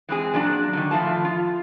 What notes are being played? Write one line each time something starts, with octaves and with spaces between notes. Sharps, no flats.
E3 G#3 C4 G#4
A#2 F#3 D4
D3 D#3
A2 F3 A3 F4 A5
F4